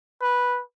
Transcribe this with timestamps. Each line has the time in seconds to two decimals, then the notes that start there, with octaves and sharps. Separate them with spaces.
0.22 B4